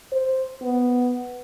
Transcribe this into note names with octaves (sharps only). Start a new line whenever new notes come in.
C5
B3